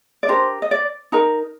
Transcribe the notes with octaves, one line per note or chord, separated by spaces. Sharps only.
D5
D4 G4 A#4 C5
D#5
D5
D#4 A#4 A#5